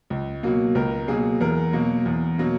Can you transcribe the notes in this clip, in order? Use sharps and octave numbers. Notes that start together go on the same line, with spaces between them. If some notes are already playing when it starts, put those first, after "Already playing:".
C#2
B2 F#3 A#3
C#2 A#4
B2 F#3 A#3 G#4
E2 A#4
B2 F#3 A#3
E2
B2 F#3 A#3